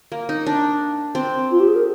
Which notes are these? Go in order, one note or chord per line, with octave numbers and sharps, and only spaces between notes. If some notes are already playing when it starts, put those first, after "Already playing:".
A#3
D#4
D4
C4
F4
G4
G#4
A#4